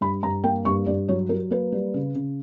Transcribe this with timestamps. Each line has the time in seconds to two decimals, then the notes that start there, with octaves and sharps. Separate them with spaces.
0.01 G2 B5
0.23 G2 A#5
0.44 A#3 G5
0.65 G2 C#6
0.86 G2 D5
1.08 F#3 C#5
1.29 F#3 A#4
1.51 A#3 B4
1.72 G3
1.94 C#3
2.15 C#3